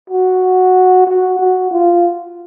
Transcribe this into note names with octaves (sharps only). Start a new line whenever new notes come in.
F#4
F#4
F#4
F4